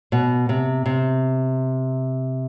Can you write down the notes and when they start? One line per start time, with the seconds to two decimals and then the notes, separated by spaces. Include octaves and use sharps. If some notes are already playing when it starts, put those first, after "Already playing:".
0.12 B2
0.49 C3
0.86 C3